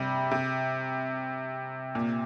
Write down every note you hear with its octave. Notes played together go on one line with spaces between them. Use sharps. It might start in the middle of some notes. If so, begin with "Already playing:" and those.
Already playing: C3 G3
C3
A#2